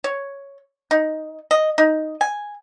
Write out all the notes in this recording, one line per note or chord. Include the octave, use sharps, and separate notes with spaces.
C#5
D#4
D#5
D#4
G#5